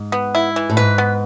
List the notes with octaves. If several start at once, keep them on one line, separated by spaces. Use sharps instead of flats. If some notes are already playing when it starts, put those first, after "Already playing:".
Already playing: G#2
B3
E4
E3
A2
G#2 B4
B3